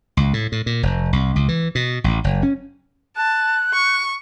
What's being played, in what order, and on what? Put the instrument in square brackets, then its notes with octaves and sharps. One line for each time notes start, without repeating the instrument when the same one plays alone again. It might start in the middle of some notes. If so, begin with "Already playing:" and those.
[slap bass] C#2
A2
A2
A#2
F1
C2
C#2
E3
B2
A1
F#1
C#4
[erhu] A5 [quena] F#6
[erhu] C#6